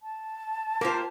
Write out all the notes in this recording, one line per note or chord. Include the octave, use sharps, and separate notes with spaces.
A5
A#3 F4 G4 A#4 C5